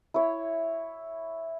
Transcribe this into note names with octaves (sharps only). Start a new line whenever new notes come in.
E4 C#5